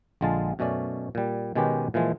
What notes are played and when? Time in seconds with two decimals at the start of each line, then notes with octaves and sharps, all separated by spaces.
0.21 A#1 D3 G#3 F4 A5
0.59 F#2 B2 A3 C#4 D5
1.15 A#2 G3
1.55 B2 D#3 G#3 C#4 G4 B4
1.94 A#2 E3 F3 G#3